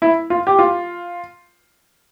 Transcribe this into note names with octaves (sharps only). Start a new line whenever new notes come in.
E4
F4
G4
F4